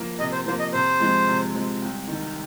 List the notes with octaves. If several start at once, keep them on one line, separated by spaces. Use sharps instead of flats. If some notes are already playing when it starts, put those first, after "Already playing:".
Already playing: F3 A#3
C3 D#5
C5
F3 A#3 C5
D#5
C3 C5
F3 G#3 C4
C3
F3 G#3 C4
C2
C3 D#3